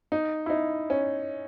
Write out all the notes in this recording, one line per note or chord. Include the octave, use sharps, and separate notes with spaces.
D#4
E4
D#4
C#4